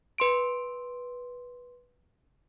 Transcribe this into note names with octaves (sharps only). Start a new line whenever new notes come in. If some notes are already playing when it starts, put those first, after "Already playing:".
B4 C6 D7